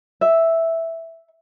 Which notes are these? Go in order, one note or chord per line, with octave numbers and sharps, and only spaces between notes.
E5